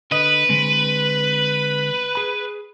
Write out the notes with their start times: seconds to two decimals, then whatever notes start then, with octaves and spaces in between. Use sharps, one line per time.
0.11 D3 B4 D#5
0.49 D3 G#3 C4
2.15 G#4 B5